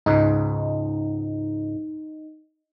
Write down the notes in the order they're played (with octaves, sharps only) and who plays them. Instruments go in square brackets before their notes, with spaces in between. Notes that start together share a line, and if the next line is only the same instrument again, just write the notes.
[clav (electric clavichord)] C#2 G#2 [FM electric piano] D#4